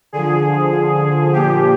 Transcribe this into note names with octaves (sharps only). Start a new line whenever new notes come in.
D3 F3 G#4
A#2 F3 G4